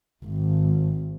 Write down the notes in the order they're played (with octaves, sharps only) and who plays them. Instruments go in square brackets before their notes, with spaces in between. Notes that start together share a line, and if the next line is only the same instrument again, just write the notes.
[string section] G#1